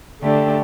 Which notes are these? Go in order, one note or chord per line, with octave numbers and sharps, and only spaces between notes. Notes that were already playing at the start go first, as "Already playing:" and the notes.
D3 A3 D4 G4